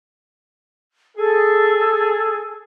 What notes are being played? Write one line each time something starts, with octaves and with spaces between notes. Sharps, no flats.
G#4 A4